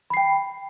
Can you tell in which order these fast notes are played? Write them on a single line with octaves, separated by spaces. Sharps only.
B5 C7 G5